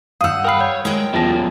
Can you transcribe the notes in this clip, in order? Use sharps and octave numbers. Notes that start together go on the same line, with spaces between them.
G2 F5 F#5 D#6 E6 G6
A#4 G5 B5 F6 C7
C#5 G6
G#3 A#4 C#5 G5
E1 F#2 A#2 F3 A#6